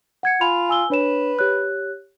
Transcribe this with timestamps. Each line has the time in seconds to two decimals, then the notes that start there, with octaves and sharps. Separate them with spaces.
0.23 F#5 G#6 C#7
0.41 F4 G#5 B5 F7
0.69 G#5 E6 G7
0.90 D4 B4 C#5 E7
1.39 G4 C#5 F#6